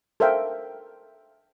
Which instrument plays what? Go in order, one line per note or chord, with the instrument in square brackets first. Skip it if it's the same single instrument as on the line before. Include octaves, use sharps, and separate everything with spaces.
[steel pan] A4 A#4 C5 E5 F5 G5